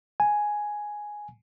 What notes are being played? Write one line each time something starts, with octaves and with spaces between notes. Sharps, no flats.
G#5